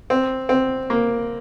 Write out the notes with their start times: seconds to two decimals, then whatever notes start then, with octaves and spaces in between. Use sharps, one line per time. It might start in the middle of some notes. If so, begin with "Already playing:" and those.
0.10 C4
0.49 C4
0.90 A#3